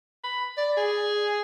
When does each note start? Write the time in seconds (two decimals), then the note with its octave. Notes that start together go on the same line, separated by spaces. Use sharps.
0.24 B5
0.57 D5
0.77 G#4